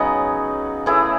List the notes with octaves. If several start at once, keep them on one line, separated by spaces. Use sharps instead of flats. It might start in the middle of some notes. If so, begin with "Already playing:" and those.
Already playing: C#3 F#3 B3 D#4 F#4
A2 E3 A3 E4 G#4